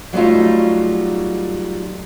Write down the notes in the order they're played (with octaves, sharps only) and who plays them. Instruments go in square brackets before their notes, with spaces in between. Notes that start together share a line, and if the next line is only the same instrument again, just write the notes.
[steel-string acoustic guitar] F#3 G3 A3 D#4 F4